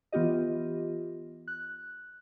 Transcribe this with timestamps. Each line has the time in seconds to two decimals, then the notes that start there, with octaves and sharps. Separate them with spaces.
0.12 E3 B3 F4 G4 D#5
1.48 F#6